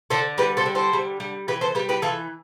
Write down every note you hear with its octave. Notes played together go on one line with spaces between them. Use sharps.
D3 A4 C5
G3 G4 B4
A4 C5
D3
A4 C5
G3
G3
E3 G4 B4
A4 C5
G3 G4 B4
G4 B4
E3 F4 A4